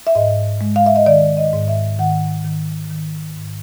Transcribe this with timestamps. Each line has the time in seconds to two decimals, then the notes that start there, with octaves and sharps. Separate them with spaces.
0.07 E5
0.15 G#2 D#5
0.61 G#3
0.76 F5
0.86 E5
0.96 D#5
1.06 D#3 D5
1.37 D#5
1.53 G#2
1.68 E5
1.99 D#3 F#5
2.44 D#3
2.90 D#3
3.36 G#2